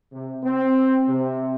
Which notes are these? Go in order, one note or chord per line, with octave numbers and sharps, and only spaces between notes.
C3
C4
C3